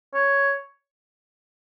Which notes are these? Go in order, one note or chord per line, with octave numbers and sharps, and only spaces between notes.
C#5